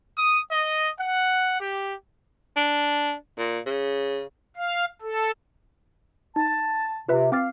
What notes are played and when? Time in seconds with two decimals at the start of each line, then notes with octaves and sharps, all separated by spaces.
0.17 D#6
0.51 D#5
0.99 F#5
1.60 G4
2.56 D4
3.38 A#2
3.66 C#3
4.56 F5
5.01 A4
6.36 D#4 A5
7.08 C3 F4 B4 E5
7.32 C4 F5 D6 A6